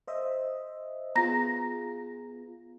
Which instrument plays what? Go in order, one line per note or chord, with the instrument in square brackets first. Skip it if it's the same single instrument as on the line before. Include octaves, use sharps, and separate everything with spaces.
[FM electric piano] C5 D#5 E5
[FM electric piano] B3 F4 G#4 [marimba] A#5 A#6